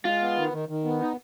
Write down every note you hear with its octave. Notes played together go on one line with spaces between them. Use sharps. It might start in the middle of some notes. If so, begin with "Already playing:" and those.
G#3 F4
B3
D#3
D#3
D#3
B3
D#4